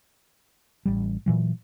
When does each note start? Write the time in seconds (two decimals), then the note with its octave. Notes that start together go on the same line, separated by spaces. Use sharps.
0.85 A1 G3
1.26 A#2 E3 F#3